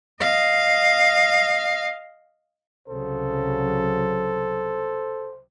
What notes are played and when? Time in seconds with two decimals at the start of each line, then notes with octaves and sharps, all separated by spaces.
0.20 D#5 F5
2.88 C2 C#3 F#3 A4 C5